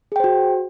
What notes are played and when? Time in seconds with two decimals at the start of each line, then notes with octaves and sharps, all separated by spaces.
0.12 G#4
0.16 G5
0.20 C5
0.24 F#4